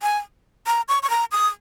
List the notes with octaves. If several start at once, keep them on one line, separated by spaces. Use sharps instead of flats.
G#5
A#5
C#6
C#6
A#5
D#6